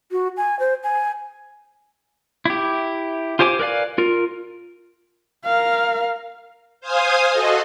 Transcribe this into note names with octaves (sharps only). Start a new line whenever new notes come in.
F#4
G#5
C5
G#5
E4 G4
F4 G4 C5 G#5 D6
A#4 B4 D5 F5 G#5
F4 A#4
A#4 F5
C5 F5 G#5 D#6
F#4 A4 D#5